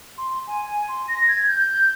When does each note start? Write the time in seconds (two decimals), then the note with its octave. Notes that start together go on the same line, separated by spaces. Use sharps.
0.18 C6
0.47 G#5
0.68 G#5
0.88 C6
1.08 A#6
1.28 G#6
1.47 G6